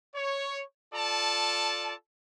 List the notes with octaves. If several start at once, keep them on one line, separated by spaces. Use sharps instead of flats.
C#5
F4 A4 D5 A5